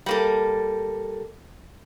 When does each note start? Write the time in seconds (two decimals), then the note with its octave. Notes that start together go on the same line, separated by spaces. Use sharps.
0.06 G3 A#3 A4